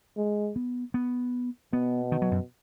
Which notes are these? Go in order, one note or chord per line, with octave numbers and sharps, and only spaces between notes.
G#3
B3
B3
B2 B3
D#3
F#3
F#2